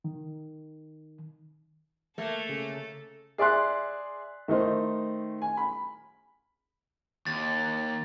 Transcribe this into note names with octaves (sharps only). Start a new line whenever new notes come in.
D#3
A3 A#3 A4
C#3
G#4 D5 E5 C6 F#6
D#3 A3 D#4 C5
G#5
B5
D#2 A6